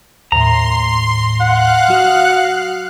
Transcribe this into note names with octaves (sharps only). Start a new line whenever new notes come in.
D#2 A2 A#5 C6
F5 F#5 F#6
F#3 F#4 D#6